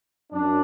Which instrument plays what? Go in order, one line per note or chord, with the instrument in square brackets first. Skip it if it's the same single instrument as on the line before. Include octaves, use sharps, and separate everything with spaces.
[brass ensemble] F#2 D4